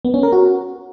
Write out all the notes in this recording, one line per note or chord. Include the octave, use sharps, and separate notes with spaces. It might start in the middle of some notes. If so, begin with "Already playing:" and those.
B3
C#4
A#4
F#4